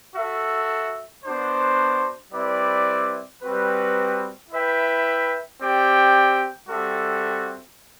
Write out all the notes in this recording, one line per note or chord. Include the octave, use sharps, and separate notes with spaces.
F#4 A4 E5
B3 D4 F#4 C5
G3 C4 E4 B4 D5
G3 C4 F#4 B4
E4 B4 E5 G5
C4 G4 D5 G5
G3 C4 F#4 A4 E5